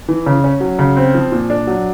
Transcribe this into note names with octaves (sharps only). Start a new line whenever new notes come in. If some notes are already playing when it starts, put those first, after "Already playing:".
E3
C#3
C#4
F#3
C#3
C4
F3
A#2
D4
F#3